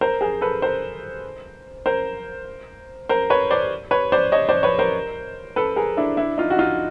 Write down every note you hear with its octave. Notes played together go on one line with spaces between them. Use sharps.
A#4 C5
G#4 A#4
A4 B4
A#4 C5
A#4 C5
A#4 C5
B4 C#5
C5 D5
B4 C#5
C5 D5
C#5 D#5
C5 D5
B4 C#5
A#4 C5
A4 B4
G#4 A#4
D4 E4
D4 E4
D#4 F4
F#4
D#4 F4